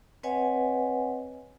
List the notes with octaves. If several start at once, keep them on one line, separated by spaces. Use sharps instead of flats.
C4 B4 C#5 D#5 F#5 G#5